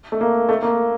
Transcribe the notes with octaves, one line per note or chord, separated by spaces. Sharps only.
A3
A#3
A3
A#3